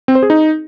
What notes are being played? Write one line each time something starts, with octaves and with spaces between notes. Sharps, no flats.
C4
C5
G#4
D#4